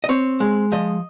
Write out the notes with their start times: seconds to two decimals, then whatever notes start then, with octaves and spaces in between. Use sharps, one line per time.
0.04 D#5
0.09 C4 C#5
0.40 G#3
0.72 F3 D#5